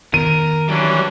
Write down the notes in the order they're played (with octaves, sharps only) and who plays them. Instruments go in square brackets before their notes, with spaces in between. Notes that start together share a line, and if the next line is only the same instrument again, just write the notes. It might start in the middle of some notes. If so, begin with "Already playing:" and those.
[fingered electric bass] D#3 B3 [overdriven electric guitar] A#4 [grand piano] D#7
[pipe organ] E3 C#4 D4 [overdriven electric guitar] F#3 G3